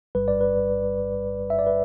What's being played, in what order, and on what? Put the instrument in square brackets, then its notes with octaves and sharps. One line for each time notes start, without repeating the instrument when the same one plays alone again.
[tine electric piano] G1 G2 G3 B4
D5
B4
E5
D5
B4